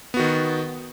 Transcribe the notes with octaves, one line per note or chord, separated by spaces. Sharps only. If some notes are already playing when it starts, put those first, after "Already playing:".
D#3 B3 F#4